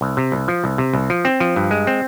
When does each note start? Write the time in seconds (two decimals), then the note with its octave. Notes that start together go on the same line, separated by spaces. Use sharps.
0.01 C2
0.17 C3
0.32 C2
0.48 F3
0.64 C2
0.78 C3
0.93 C2
1.10 F3
1.25 C4
1.40 F3
1.56 G2
1.71 G#3
1.87 C4